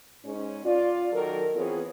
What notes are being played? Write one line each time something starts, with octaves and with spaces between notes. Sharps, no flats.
G#2 C#4
F4 D5
D#3 F#3 A4 A#4
E3 B3 C4 F4 G#4 C#5